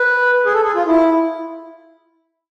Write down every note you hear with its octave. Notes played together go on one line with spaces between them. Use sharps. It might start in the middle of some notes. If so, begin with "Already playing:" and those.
Already playing: B4
G#4
A4
G#4
F4
E4